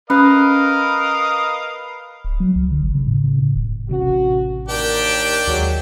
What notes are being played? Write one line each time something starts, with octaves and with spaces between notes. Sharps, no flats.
C#4 A#4 B4 D#5 F5
D1
F#3
C2
D3
G1
C#3
A2
C#3
A2
E1
A1 C3 C#4 F#4
D#2 D4 G4 A#4 G5
D#2 F#3 G#3